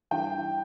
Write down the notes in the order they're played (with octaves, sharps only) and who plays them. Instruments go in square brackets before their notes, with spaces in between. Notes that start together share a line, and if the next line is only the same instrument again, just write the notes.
[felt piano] G2 E3 G5